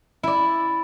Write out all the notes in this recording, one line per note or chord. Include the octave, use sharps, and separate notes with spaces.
E4 D5